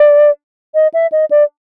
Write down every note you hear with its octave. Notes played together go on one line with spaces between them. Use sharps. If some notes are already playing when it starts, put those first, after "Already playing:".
Already playing: D5
D#5
E5
D#5
D5